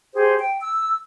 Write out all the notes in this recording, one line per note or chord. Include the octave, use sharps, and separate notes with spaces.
G4 G#4 C5
G5
E6